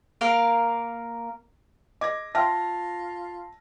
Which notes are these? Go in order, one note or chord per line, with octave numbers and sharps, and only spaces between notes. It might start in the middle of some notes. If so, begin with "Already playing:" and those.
A#3 A#4 F5
D#5 D6 G#6 A#6
F4 E5 G5 A5 C6 F6 A#6